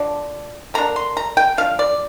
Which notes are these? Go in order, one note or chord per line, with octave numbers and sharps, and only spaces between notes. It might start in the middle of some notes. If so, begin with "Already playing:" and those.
Already playing: D3 F3 D4 D5
D3 A#3 D4 A#5
C6
A#5
G5
F3 D4 F5
D5